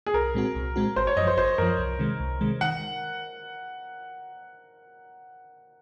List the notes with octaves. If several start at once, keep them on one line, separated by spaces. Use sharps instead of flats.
G#4
C2 A#4
A#2 G#3 C4 F#4
C2
A#2 G#3 C4 F#4
G#1 C5
C#5
F#2 F3 D#5
C5
G#1 C5
F#2 F3 A#4
C2
C3 D#3 G#3
C2
C3 D#3 G#3
D#3 F#5